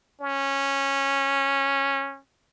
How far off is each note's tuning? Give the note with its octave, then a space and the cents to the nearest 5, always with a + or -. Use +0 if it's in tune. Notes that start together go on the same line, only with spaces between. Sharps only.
C#4 -10